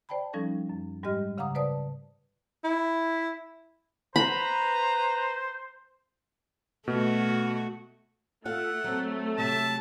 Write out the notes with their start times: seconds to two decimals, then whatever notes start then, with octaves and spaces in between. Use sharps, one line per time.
0.09 C5 D5 G5 A5 B5
0.33 F3 G3 C#4 D#4 A4
0.69 F#2
1.03 G#2 G3 G#3 G4 D#5 F6
1.38 C#3 F5 F#5 A#5 D6 D#6
1.55 B4 C5 D5 A5 D#6
2.64 E4
4.16 B4 C5 A#5 B5
6.88 B2 A3 F#4
8.45 A3 F4 A4 F5 F#5
8.84 F#3 C4
9.38 C3 F#3 G4 E5 A5